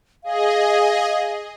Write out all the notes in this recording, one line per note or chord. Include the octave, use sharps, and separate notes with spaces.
G#4 D#5 F5